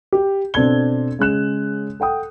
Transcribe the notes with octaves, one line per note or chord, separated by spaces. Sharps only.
G4
B2 C4 D4 A4 G#6 G7
C#3 G#3 F#6 E7
A4 F#5 G5 D#6